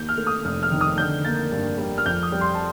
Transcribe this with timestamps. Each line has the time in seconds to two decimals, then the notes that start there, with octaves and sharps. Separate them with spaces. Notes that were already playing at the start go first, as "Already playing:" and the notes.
Already playing: D#2 G6
0.09 F6
0.17 A3
0.27 D#6
0.45 F1 F6
0.63 F6
0.71 D#3
0.81 D#6
0.98 D3 G6
1.25 A#3 A6
1.52 G2
1.78 G3
1.98 F6
2.06 F2 G6
2.23 D#6
2.32 G3
2.41 C6
2.54 A5